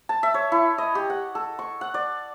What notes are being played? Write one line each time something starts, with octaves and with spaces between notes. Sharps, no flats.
A5
E5
C#5
E4
D#5
G4
F#5
A4
C#6
F#5
D5